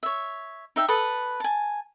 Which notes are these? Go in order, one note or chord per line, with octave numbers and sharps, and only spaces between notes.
C#5 E5
D#4 E5 G5
A4 B4 B5 D#6
G#5 A5